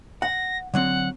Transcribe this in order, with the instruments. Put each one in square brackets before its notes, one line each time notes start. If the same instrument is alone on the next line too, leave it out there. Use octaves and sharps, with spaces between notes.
[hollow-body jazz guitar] F#5 [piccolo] A#6
[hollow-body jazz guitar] D3 F#3 C4 [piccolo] F#5